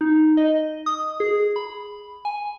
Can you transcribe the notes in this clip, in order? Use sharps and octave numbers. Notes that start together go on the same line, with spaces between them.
D#4
D#5
D#6
G#4
B5
G#5